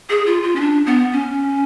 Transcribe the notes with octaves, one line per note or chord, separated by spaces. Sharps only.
G#4
F4
F4
C#4
D4
B3
C#4